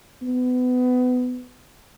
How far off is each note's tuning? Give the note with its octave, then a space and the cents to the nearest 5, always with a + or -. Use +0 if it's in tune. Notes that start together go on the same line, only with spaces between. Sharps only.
B3 +25